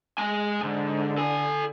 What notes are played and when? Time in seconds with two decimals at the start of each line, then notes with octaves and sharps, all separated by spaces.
0.18 G#3 G#5
0.63 G#2 D3
1.18 A4 G#5